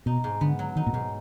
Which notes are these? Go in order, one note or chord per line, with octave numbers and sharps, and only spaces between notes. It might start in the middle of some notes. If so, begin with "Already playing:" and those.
B2 D#4
G#2
D3 B3
F#3
D#3 D#4
A#2
G#2 B2